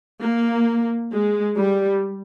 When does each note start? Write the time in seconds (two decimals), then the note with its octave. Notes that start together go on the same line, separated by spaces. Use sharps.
0.20 A#3
1.11 G#3
1.56 G3